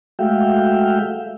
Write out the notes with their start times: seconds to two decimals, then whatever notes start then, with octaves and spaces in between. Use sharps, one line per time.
0.19 G#3 A3 F#4 E5 F5 G5